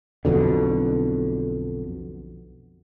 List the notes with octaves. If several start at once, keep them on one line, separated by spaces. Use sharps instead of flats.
B1 F2 B2 D3